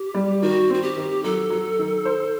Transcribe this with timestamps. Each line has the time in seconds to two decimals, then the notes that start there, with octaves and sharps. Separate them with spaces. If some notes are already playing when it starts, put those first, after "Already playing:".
Already playing: G4
0.14 G3
0.42 D#3 F#4
0.70 C4 F#4
0.82 G4
0.96 D#3
1.24 F#3 A4
1.50 F#3
1.79 D#3
2.05 C5